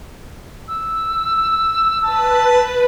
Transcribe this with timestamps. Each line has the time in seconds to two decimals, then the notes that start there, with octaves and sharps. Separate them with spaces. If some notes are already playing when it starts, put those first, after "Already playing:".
0.68 E6
2.05 B4 A5